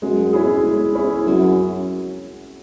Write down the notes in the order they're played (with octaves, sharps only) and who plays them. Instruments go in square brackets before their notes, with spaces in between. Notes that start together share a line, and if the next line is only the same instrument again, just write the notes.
[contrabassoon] F#2 [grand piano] G#3
[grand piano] C#4 E4 G#4
G#3
C#4 E4 G#4
[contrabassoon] F#2 [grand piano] F#3